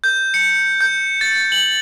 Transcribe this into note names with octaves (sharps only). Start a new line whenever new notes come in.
G6
C#7
G6
A6
F#7